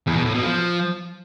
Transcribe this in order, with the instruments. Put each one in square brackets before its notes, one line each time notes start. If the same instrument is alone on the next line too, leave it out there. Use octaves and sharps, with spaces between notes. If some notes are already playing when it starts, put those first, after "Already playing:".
[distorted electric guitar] E2
B2
A2
B2
F3